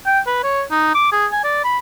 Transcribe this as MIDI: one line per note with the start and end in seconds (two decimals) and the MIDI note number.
0.06 0.20 79
0.27 0.39 71
0.43 0.62 73
0.71 0.91 63
0.94 1.09 86
1.12 1.26 68
1.32 1.41 80
1.44 1.62 74
1.64 1.78 83